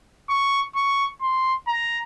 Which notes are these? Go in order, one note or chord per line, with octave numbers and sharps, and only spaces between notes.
C#6
C#6
C6
A#5